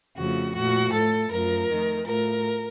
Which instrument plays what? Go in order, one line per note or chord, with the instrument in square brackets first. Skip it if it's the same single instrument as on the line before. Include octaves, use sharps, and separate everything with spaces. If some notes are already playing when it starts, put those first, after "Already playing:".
[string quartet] F2 C#3 F3 A3 F#4
A#2 F3 A3 F#4
A2 A3 A4
F#2 F3 A3 A#4
F2 D#3 A3
A2 F3 A3 A#4